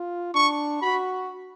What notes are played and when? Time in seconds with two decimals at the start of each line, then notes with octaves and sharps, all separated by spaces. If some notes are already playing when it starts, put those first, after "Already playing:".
Already playing: F4
0.35 D4 C#6
0.82 F#4 B5